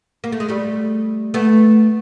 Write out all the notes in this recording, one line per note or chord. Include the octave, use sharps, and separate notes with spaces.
A#3
A3
G#3
G3 A3
A3 B3